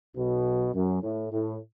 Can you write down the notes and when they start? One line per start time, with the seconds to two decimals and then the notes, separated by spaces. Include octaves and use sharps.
0.16 B1 B2
0.75 F#2
1.02 A2
1.31 A2